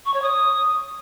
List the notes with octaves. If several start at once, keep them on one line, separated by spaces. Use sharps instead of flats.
C#6
C#5
D#6